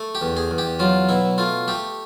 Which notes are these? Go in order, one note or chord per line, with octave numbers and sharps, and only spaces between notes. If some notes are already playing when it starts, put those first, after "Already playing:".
Already playing: A3
G4
E2
G#4
E2
G4
F#3 F4
B2 E4
A3 F4
A3 G4